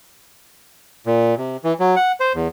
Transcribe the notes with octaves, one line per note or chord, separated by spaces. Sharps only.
A#2
C3
E3
F#3
F#5
C5
E2